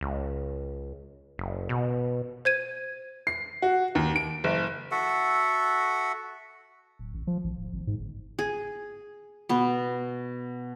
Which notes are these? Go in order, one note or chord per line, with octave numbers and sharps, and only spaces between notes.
C#2
F#1
B2
C5 G#6 D#7
C7
F#4
D#2
D7
F#1
F#4 A4 E5 F#5
D1
A1
F3
A1
D1
G#1
G#2
G1
G#4
B2 B3